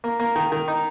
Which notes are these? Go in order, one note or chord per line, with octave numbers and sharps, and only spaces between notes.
A#3
A#3
D#3
D#3
D#4